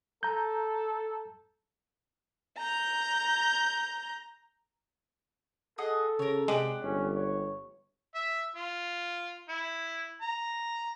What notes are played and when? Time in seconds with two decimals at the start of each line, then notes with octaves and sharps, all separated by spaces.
0.23 A4 A#5 G6
2.58 A#5 G6
5.78 G#4 A4 D#5 F#5
6.19 C#3 A#4 C#5
6.48 C3 G#3 D4 G4 F#5
6.83 G1 C#4
7.16 C#5
8.15 E5
8.56 F4
9.49 E4
10.21 A#5